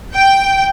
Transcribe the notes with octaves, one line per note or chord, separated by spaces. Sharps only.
G5